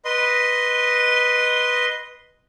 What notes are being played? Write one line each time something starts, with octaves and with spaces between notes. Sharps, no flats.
B4 D#5 C6